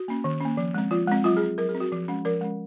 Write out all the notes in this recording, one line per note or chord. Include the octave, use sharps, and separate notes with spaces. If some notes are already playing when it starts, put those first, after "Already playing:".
Already playing: F#4
A#3 C#4
D#3
A#3 C#4
F3
G#3 C4
F3 F4
G#3 C4
F#3 F4
G#4
C4
F#3 A#4
G#4
C4
F#4
F3
G#3 C#4
F3 A#4
G#3 C#4